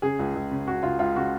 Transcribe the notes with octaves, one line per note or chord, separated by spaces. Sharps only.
C#3 G#4
C#2
C#2
C#3
C#3 F#4
C#2 F4
C#2 F4
C#3 F#4